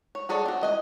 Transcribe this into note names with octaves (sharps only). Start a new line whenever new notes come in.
C#5
F#4 G#4 A4 C#5 D5
C4 F#4
E3 D#5 G#5